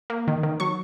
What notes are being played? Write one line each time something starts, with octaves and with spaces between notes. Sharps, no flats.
A#3
D#3
D#3
F#3 C#6